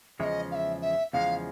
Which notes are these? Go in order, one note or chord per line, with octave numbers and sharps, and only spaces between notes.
E2 C#3 F3 G#3 D#5 E5
F5
E5
E5
E2 C#3 F3 G#3 F5